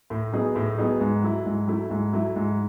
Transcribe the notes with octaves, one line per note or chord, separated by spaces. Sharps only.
A2
F#3 B3 D#4 G#4
A2
F#3 B3 D#4 G#4
G#2
F#3 A3 E4
G#2
F#3 A3 E4
G#2
F#3 A3 E4
G#2